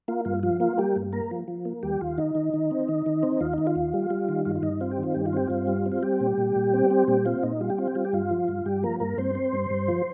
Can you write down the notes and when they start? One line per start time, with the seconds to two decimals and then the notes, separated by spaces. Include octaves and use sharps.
0.08 A#3 F4
0.25 G2 F4
0.43 F3 F4
0.60 A#3 F4
0.78 G3 A#3 G4
0.96 G2
1.13 A#3 A#4
1.31 F3
1.48 F3
1.65 A#3
1.83 D#2 G3 G4
2.01 D#2 F4
2.18 D#3 D#4
2.35 D#3
2.54 D#3
2.71 C4
2.89 D#3
3.06 D#3
3.23 C4
3.41 D#2 F4
3.53 D#3 D#4
3.67 F4
3.76 D#2
3.94 G3
4.10 G3
4.29 D#3
4.45 G2 F4
4.56 F4
4.63 G2 D#4
4.81 C4 F4
4.92 G4
4.98 D#3
5.03 F4
5.14 G2 G4
5.26 F4
5.33 C4 G4
5.47 G2 F4
5.67 G3
5.86 C4
5.92 F4
6.02 G3 G4
6.20 A#2
6.37 A#2
6.56 A#2
6.74 C4
6.91 C4
7.07 A#2 G3 G4
7.25 C4 F4
7.43 A#2 D#4
7.61 G3 F4
7.70 G4
7.78 C4 F4
7.88 G4
7.95 G3 F4
8.05 G4
8.13 G2 F4
8.31 F3
8.48 G2
8.66 G2 G3 G4
8.83 F3 A#3 A#4
9.00 G2 A#3 A#4
9.18 G2 C4 C5
9.35 C4
9.53 G2
9.70 G2
9.88 F3